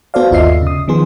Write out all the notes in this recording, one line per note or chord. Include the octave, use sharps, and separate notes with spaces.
B3 F#4 A4 C5 D5 F5
G1 D#2 F4 D#5 E5 C7
C#3 D#6
D#3 F3 B3 G#4 C6